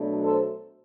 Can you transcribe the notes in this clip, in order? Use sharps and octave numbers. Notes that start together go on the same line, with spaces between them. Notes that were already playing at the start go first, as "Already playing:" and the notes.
Already playing: B2 F#3 A3 D4
A4 C5